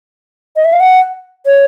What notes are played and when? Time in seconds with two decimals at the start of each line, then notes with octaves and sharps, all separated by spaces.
0.56 D#5
0.65 E5
0.73 F5
0.80 F#5
1.46 C#5